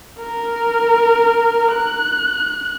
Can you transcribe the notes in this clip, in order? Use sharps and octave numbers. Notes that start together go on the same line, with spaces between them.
A#4
F#6